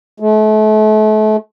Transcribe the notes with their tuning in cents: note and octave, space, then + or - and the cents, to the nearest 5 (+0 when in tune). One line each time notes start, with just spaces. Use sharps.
A3 -35